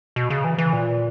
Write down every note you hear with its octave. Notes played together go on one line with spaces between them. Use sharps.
B2
C#3
E3
E3
A#2